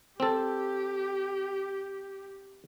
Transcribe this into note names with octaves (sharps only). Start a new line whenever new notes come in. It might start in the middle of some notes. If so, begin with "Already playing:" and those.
C4 G4 A4